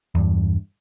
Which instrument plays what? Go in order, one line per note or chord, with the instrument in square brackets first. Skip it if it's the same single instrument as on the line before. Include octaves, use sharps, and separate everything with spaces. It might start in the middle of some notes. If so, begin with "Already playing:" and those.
[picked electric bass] E2 G2